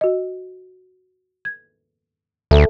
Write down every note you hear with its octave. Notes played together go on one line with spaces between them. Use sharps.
F#4 D#5
G#6
D2 A4 E5 A5